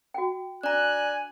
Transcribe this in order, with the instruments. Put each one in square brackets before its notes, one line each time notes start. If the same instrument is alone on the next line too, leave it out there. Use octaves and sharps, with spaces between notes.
[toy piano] F#4 G5
[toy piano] D4 [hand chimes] D5 A#5 [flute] G#5 [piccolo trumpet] F#6